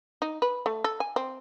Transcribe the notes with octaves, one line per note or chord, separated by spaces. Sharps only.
D#4
B4
A3
A4
G#5
C4